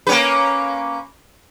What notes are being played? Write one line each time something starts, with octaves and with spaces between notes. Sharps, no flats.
A#3 C#4 B4